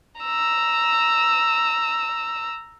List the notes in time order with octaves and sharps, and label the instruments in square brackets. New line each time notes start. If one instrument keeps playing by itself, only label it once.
[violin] A#5 E6